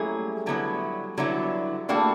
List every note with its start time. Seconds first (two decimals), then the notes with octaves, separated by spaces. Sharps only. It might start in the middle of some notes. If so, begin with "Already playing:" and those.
Already playing: F#3 G3 A3 A#3 C#4 E4 G#4
0.46 D3 F#3 B3 E4
1.18 D3 F#3 B3 E4
1.88 G3 A3 A#3 D4 F#4